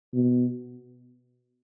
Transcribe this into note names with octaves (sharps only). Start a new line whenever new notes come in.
B2